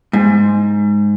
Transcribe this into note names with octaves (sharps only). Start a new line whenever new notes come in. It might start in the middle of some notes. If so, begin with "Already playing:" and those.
G#2